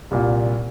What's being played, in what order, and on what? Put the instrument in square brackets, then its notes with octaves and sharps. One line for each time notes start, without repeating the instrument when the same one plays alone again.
[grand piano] C2 A#2 G3